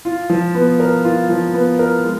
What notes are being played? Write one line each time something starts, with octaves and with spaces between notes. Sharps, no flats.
F4
F3
B3
A#4
F4
F3
B3
A#4
G#3